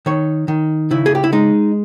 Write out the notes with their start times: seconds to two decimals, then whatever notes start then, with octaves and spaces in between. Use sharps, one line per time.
0.06 D#3 C#5
0.48 D#3
0.91 C#3 E4
1.06 G#4
1.15 G4
1.24 E4
1.33 G#3 D#4